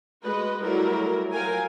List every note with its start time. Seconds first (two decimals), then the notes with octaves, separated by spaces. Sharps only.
0.23 G#3 F#4 B4 D#5
0.61 F#3 G3 A3 E4 A#4
1.32 F3 F#3 A#4 F5 G5 G#5